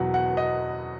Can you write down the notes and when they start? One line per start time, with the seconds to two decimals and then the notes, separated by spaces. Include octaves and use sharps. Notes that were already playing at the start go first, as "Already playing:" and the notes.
Already playing: E2 B2 F#3 F#5
0.14 F#5
0.37 D#5